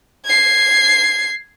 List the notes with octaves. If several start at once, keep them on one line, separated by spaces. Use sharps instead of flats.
G#6 C7